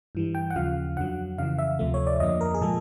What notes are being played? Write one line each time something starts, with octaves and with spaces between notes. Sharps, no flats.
G2 E3 G3
G5
F#5
D#2 C#3 F3 F5
F2 D3 F#3 F#5
F2 C#3 E3 F5
E5
D2 C3 F3 A3
C#5
D5
F2 D3 F3 A#3 D#5
A#4
G#4
A#2 F3 G#3 A4